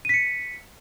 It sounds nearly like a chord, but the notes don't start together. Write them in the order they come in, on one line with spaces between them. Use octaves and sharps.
D#7 B6 C#7